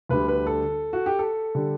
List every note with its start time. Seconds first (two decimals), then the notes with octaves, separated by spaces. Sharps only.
0.09 D2 D3 G3 B4
0.28 B4
0.47 A4
0.93 F#4
1.06 G4
1.19 A4
1.55 D3 G3